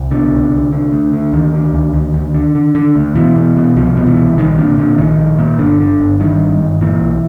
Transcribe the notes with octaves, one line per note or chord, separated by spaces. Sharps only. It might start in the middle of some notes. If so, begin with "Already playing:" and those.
Already playing: C2
B2 D3
C2
C2
D3
D2
D3
D2 D#3
D3
D2
D2
D2
D3
D3
D3
D2
B2 E3
B2
B2
C2 F3
B2
E3
C2
A#1 D#3
A#2 D3
A#2 D3
A#1 D#3
A#1
A#2
G1 D3
D3
G1
G2 D#3
G1
G1
A#2 E3
B1